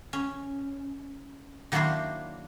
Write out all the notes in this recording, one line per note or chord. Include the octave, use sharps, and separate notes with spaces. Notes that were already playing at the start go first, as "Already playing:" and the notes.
C#4
D#3 F#3 A#3 D4 E4 C5